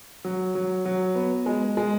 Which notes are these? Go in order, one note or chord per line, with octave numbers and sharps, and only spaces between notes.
F#3
F#3
F#3
B3
G#3
G#3